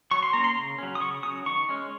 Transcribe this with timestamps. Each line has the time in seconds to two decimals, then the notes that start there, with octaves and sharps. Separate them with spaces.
0.11 F#3 C#6
0.23 C6
0.33 A#3 C#4 A#5
0.44 C6
0.56 C#3
0.78 F#3 C#4
0.95 D#6
1.00 C#3 C#6
1.23 F#3 C#4 D#6
1.46 D#3 C#6
1.69 G#3 C#4